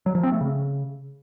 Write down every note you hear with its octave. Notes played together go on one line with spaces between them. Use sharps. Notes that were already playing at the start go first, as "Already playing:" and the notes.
F#3
F3
C4
A3
C#3